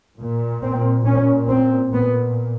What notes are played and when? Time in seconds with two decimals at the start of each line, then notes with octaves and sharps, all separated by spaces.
0.20 A#2
0.63 C4
1.06 A#2 C#4
1.49 C4
1.92 A#2 B3